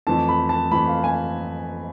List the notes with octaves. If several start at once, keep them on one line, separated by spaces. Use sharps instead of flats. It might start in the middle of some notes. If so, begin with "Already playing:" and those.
F2 E3 A3 C4 A5
B5
A5
F2 E3 A3 C4 B5
F5
G#5